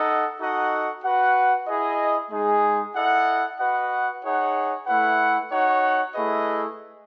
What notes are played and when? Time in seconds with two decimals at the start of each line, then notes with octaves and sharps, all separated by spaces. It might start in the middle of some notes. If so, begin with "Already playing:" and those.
Already playing: D#4 A4 D#5 F#5
0.39 D#4 F#4 A4 D#5 F#5
1.03 F#4 B4 F#5
1.67 E4 G#4 D#5
2.30 G#3 D#4 G#4
2.95 E4 A4 D#5 F#5
3.59 F#4 B4 D#5 F#5
4.23 D#4 G#4 C#5 F#5
4.87 A3 E4 B4 F#5
5.51 D#4 F#4 C#5 F#5
6.14 A3 E4 G#4 B4 D#5